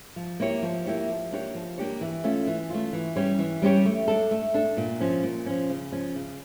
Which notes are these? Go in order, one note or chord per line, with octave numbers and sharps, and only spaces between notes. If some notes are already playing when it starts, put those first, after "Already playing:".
F3
A#3 E4 G4 C#5
F3
A#3 E4 G4 C#5
F3
A#3 D4 G4 C#5
F3
A#3 D4 G4 C#5
E3
A3 C#4 F4
E3
A3 C#4 F4
E3
G3 C#4 G4 C#5
E3
G3 C#4 G4 C#5
A3
D4 A4
A3
D4 A4
A#2
F3 C#4
A#2
F3 C#4
C#3
F3 C#4
C#3